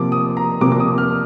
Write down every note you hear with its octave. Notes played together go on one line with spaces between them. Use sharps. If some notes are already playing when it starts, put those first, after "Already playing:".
Already playing: C3 F3 A#3 D6
D#6
A#5
C3 F3 A#3 D6
D6
D#6
F6